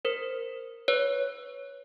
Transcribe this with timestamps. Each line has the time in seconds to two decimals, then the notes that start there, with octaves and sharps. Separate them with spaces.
0.05 A#4 C5
0.88 B4 C#5